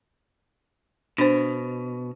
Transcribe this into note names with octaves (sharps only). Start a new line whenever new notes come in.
B2 D4 C5